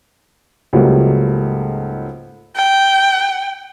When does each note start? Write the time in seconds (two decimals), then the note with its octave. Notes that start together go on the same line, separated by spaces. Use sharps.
0.73 C#2 G#2 F#3 G3 A3 A#3
2.56 G5